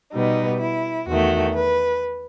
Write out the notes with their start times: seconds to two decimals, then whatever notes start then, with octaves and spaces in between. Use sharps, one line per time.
0.14 B2 G3 B3 D#4
0.61 E4
1.08 E2 D#3 A3 F#4
1.56 B4